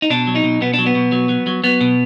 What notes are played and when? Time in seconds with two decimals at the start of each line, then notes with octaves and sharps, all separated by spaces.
0.02 D#4
0.10 B2 D4
0.27 F#3
0.35 D#4
0.44 B2
0.61 B2 B3
0.74 D4
0.79 F#3
0.86 B3
0.95 B2
1.12 F#3
1.29 F#3
1.47 F#3
1.64 F#3 B3
1.81 B2